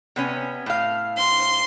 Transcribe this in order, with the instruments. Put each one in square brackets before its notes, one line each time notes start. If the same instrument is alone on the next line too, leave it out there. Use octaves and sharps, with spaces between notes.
[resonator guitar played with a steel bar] C3 B3 C#4
A2 F5
[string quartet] C6